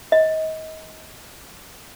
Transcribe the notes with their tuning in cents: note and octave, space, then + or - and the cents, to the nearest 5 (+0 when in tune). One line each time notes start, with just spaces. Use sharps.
D#5 +30